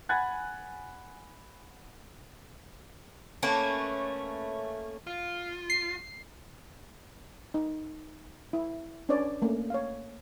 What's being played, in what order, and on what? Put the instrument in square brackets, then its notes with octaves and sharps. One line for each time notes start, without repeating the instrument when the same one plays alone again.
[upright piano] F#5 G#5 B5 F#6 G#6 A6
[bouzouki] A3 A#3 C#4 B4
[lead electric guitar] F4
[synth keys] C7
[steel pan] D#4
E4
C#4 D4 B4 C#5 D5
A3 A#3 C#4
C#5 F5